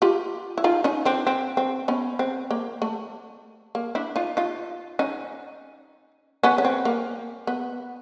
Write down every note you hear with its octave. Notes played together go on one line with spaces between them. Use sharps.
F4 G4
E4
D#4 F4
C#4 D#4
C4 D4
C4
C4
B3 C#4
C4
A#3
A3
A#3
D4 E4
D#4 F4
D#4 F4
C#4 D#4
B3 C#4
C#4
C4
A#3
B3